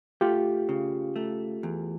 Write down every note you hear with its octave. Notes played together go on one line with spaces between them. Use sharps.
A3 F4 G4
C#3
A3
E2